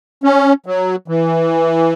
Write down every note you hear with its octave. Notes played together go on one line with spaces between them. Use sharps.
C#4
F#3
E3